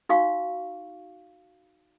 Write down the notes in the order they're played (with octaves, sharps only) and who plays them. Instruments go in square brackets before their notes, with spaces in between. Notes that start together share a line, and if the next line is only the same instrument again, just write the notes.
[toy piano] D#4 F#4 F5 C#6